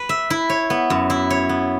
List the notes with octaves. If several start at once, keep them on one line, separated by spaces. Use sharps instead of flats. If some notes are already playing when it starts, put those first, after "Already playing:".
Already playing: B4
E5
E4
C#5
B3
F#2
E4
C#5
B3